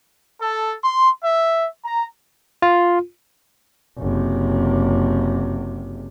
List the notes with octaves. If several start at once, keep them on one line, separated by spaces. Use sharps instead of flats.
A4
C6
E5
A#5
F4
F#1 C3